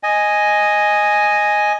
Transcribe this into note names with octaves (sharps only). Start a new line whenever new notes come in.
D#5 G#5